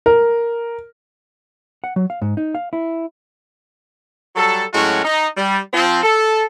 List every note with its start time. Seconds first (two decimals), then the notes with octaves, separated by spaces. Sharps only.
0.06 A#4
1.84 F#5
1.96 F#3
2.10 F5
2.22 G#2
2.37 D#4
2.55 F5
2.73 E4
4.35 F#3 G3 A4
4.74 A2 F#3 G#3 C#4 F#4
5.05 D#4
5.37 G3
5.73 F3 C4
6.03 A4